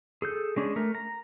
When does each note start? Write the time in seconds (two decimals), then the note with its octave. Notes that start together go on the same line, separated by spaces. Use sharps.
0.22 G#4 A4 G6
0.56 G#3 C#4 D4 G#4
0.76 A3 A#4
0.95 A#5